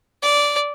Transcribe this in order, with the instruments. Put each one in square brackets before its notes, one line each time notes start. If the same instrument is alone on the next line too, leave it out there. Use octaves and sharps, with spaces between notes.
[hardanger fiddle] D5